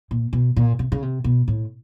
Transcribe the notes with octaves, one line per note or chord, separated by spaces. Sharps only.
A#2
B2
A#2
C3
C#3
C3
B2
A2